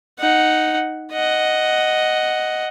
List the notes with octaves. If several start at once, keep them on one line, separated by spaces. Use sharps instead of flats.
D#4 F#5
D#5 F#5